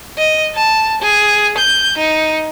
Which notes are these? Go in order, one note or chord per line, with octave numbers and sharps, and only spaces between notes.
D#5
A5
G#4
G6
D#4